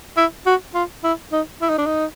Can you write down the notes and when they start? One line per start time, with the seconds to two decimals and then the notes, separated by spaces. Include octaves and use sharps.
0.17 E4
0.46 F#4
0.74 F4
1.04 E4
1.32 D#4
1.62 E4
1.69 D#4
1.78 D4
1.86 D#4